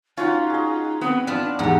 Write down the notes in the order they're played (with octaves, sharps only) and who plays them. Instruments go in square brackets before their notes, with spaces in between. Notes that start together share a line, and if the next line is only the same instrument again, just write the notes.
[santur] C#4 F#4 F#5 [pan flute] D#4 [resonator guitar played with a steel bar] F4
[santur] G#4 D#5
[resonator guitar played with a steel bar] B3 [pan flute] C4
[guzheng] B3 F4 [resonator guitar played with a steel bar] D4
[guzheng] E2 G#2 [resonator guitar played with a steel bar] G4 F#5